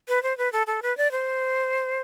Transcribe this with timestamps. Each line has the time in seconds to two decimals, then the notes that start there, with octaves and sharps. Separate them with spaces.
0.08 B4
0.23 C5
0.38 B4
0.52 A4
0.67 A4
0.82 B4
0.97 D5
1.11 C5